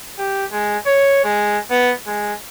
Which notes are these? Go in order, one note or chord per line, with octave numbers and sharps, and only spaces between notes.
G4
G#3
C#5
G#3
B3
G#3